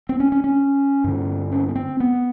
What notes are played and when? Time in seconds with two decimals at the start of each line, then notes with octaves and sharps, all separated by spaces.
0.09 C4
0.20 C#4
0.32 C#4
0.44 C#4
1.04 G2 D3
1.51 C#4
1.69 B3
1.76 C4
2.00 B3